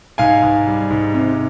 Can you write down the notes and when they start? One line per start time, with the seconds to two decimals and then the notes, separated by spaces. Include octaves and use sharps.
0.18 G#2 F5 G#5
0.42 G#2
0.67 G3
0.90 G#2
1.14 C3